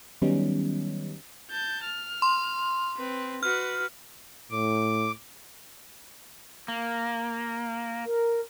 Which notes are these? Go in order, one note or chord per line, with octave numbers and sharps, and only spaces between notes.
D#3 F#3 G3 B3 C#4 D#4
A5 G6
F6
C6
C4 B4
F#4 B4 F6
A2 D6
A#3
A#4